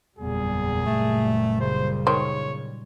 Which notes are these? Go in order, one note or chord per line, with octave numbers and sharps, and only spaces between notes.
F#1 E2 A#2 G3 G#4
A3
C#3 C5
D#3 C5 C#5